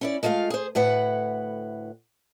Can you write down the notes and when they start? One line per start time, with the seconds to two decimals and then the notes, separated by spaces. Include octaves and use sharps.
0.01 C#4 E4 D5
0.23 G#3 A3 F4 C5 F5
0.50 G#4 C5
0.75 D2 A2 B4 F#5